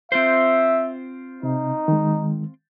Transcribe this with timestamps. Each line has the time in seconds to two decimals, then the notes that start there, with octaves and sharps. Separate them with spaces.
0.12 C4 F4 C5 E5
1.43 C3 D#4
1.88 D#3 G#3